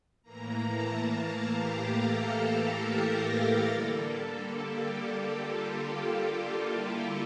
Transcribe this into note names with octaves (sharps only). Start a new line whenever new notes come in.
A2 E3 A#3 A#5
A5
F5
G4
A4
A#4
D3 G3 A#3 A4
A4
G4
F4
F4
E4